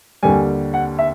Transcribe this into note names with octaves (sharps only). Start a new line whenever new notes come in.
D#2 D3 G3 G#5
F#5
E5